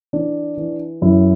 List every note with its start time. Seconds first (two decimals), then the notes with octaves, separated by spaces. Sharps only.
0.13 E3 D4
0.57 E3
1.02 F#2 E4